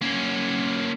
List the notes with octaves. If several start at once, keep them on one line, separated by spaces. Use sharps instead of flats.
A#3 C#4